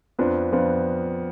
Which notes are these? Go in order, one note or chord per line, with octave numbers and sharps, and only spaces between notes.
F2 F3 B3 D4 F4
F2 F3 B3 D4 F4